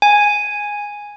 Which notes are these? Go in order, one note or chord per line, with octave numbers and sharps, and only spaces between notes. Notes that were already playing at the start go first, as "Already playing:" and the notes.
G#5